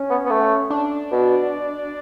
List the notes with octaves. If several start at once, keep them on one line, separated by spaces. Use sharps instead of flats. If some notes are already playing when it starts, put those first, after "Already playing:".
Already playing: C#4
B3
B3
A3
D4
B2